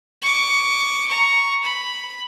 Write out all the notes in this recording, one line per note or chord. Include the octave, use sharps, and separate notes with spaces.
C#6 D6
A#5 C#6
B5